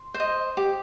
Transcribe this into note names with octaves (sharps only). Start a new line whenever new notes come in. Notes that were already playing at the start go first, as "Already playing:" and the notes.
Already playing: C6
C5
D#5
G4